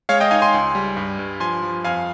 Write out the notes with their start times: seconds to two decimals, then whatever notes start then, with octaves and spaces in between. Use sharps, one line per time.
0.09 G#3 C#5 F5
0.20 D#5 G5
0.31 D#4 F5 G#5
0.42 G#5 C6
0.54 C#2
0.75 G3
0.97 G2
1.19 G2
1.40 F3 G#5 C6
1.62 F3
1.84 F2 F5 G#5